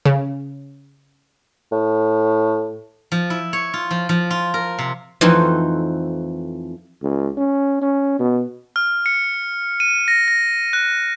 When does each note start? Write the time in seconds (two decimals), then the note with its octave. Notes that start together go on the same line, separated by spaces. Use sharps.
0.06 C#3
1.72 A2
3.12 F3
3.30 E4
3.53 C#5
3.74 F4
3.91 F3
4.09 F3
4.30 F4
4.54 A#4
4.79 C3
5.21 F2 E3 A3 C4 D#4
7.03 C#2
7.38 C#4
7.82 C#4
8.20 B2
8.76 F6
9.06 C#7
9.80 D#7
10.08 A#6
10.28 A#6
10.73 F#6